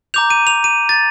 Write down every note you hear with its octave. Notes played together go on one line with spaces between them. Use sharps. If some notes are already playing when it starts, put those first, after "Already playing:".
A#5 D6 G6 F7
D#7
F7
D#7
A6